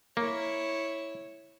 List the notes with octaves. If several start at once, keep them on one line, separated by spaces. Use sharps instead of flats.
A#3 E4 C#5